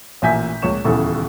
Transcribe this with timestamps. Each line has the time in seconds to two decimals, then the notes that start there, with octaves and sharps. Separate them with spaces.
0.22 A1 A#2 E5 G#5 G6 B6
0.62 C#2 A#2 C#5 C#6 E7
0.85 D#1 E2 C#3 E4 A4 C#6